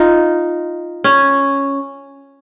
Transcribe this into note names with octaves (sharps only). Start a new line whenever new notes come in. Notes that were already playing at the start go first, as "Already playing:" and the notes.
Already playing: D#4 F4
C#4